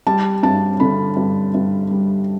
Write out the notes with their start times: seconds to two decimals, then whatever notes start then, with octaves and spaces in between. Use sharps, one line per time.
0.07 G3 A5
0.43 G2 A5
0.80 D3 B5
1.17 G2
1.54 G2
1.91 G3